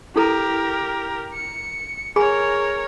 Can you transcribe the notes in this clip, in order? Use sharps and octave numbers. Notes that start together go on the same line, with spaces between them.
E4 G4 A4 A#4 A#5
C#7
G#4 A#4 C#5 G#5 B5